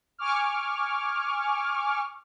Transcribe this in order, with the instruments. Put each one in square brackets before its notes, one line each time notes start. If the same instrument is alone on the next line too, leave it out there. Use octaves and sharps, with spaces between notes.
[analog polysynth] G#5 C#6 D6 F6